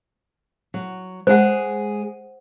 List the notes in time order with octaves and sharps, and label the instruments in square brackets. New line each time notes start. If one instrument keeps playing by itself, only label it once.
[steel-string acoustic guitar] F#3
[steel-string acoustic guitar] G#3 G#4 [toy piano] C5 F#5